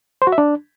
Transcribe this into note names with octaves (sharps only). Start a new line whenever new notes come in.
C5
F#4
E5
D4